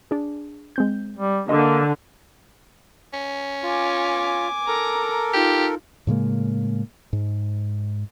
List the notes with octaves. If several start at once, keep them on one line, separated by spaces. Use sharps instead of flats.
D4 G#4
G#3 C4 G6
G3
D3 A#3 D#5
C#4
F4 G#5 D6
A4 A#4 A#5
D#4 F4 G4
A2 C#3 G#3 A#3
G#2